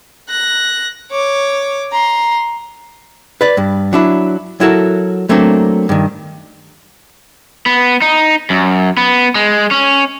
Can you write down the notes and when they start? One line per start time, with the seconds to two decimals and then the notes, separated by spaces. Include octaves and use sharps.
0.28 F#6 A#6
1.11 C#5 D6
1.92 A#5 C6
3.41 B4 D5
3.57 G2
3.93 F#3 D4 E4
4.60 F#3 E4 F#4 A4 A#4
5.29 F#3 A3 A#3 C4 D4
5.89 G2 D#3
7.66 B3
8.02 D#4
8.50 F#2
8.97 B3
9.35 G#3
9.71 C#4